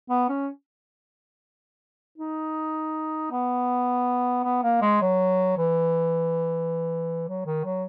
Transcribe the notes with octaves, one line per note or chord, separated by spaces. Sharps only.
B3
C#4
D#4
B3
B3
A#3
G#3
F#3
E3
F#3
D#3
F#3